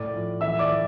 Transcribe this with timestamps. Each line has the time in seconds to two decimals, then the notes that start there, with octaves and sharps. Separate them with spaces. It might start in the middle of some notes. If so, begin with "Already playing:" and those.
Already playing: A2 D5 D6
0.14 F3
0.41 E3 E5 E6
0.59 D5 D6
0.69 E3